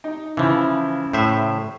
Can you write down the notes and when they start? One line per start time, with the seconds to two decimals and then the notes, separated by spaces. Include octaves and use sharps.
0.04 D#4
0.37 C#3 E3 F3 E4
1.13 A2 C5 E5